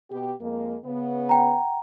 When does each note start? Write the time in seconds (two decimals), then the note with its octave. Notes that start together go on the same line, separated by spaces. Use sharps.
0.11 B2 B3 G4
0.41 F2 G#3 A#3
0.85 C#3 B3
1.29 F#5 G5 A#5